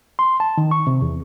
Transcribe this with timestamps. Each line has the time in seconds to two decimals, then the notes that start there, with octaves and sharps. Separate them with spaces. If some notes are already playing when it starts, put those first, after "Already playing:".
0.19 C6
0.40 A5
0.58 D#3
0.71 C#6
0.87 C3
1.02 E2